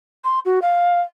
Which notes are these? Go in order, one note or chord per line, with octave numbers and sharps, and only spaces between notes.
C6
F#4
F5